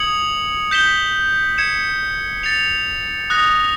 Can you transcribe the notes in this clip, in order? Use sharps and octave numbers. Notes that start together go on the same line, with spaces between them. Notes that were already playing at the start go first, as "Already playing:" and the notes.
Already playing: D#6 G#6 C#7 F#7
G6 B6 E7 G7
G#6 C#7 E7
A6 C#7 F7
D#6 F#6 A#6